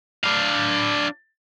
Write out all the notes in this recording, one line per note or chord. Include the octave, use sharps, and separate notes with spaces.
D4 F5